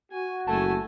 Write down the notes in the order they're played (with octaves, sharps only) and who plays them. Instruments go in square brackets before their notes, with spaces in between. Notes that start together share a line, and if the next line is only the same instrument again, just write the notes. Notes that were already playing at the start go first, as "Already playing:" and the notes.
[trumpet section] F#4 [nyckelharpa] G#5
[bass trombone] F#1 [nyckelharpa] A3 G#5 [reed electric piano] A5